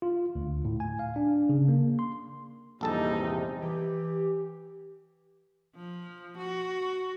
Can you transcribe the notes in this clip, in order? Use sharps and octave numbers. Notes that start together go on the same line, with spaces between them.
F4
D2
A2
G#5
F5
D4
C#3
A#3
C6
A#1 E2 G#2 C3 G3 D#4 A4 A5
E3 G4
F3
F#4